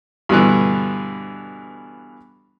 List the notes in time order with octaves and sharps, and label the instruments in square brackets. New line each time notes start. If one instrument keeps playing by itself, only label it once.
[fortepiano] G2 B2 D3 E3